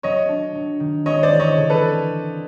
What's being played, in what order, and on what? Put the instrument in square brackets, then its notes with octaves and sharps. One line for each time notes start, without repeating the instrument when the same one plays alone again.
[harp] F#3 [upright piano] C#5 D#5
[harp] D4
F#3
D#3
[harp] G#3 [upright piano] C#5 D#5
[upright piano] C5 D5
[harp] E3
[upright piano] C#5 D#5
[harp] D3
[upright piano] A4 B4